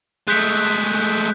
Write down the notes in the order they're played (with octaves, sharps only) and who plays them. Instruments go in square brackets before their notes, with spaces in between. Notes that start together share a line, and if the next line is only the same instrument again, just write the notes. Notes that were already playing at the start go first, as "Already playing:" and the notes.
[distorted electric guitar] G#3 A3 [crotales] F#6 G6 B6